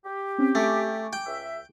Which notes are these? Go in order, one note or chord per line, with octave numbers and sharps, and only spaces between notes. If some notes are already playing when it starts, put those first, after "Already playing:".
G4
C4 C#4
A3 G#5 C#6 D6
G5
C#2 E5